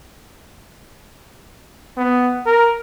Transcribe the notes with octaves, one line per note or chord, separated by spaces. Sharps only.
B3
A#4